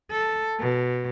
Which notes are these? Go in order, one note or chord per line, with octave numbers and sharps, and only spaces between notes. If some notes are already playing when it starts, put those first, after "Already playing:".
A4
B2